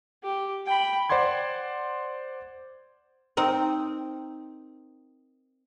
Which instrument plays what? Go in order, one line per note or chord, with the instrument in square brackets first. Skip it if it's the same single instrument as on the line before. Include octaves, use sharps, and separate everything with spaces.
[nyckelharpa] G4
G5 B5
[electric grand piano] C5 D5 F#5 C6 G#6
[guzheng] C4 D#4 A#4